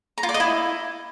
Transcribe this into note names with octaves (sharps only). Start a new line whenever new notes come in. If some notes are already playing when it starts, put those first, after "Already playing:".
A#5
F4
D5
D#5
E4